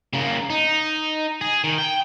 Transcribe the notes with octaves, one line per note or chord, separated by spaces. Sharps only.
C#3 A#3
D#4
G#4
D#3
G5